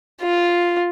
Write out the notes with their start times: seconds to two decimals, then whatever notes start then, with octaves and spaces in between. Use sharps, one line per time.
0.23 F4